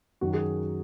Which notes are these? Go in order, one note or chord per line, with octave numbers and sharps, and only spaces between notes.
F#2 D#3 F#3 F#4
G#4